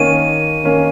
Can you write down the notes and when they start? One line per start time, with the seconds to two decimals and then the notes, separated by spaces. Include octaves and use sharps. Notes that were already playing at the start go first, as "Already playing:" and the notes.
Already playing: D#3 A#3 C#4 D#7
0.64 D#3 A#3 C#4